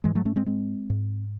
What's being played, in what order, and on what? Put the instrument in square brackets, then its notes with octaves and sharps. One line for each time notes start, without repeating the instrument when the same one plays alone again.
[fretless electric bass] G#2 E3 G#3
F#3 A3
A3 C#4
G#3 C4
G#3 C4
G#2